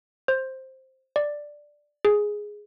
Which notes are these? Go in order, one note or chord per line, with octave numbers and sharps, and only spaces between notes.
C5
D5
G#4